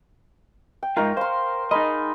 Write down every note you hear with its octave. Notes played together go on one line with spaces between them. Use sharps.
G5
G#2 D#4 F4 A#4 C#5
C5 F5 C6
D#4 G#4 A#4 D#5 B5 C6